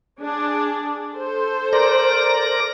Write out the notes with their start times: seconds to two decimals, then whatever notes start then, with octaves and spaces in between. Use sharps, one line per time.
0.20 D4 G#4
1.13 A4 C5
1.73 A#4 D5 A#6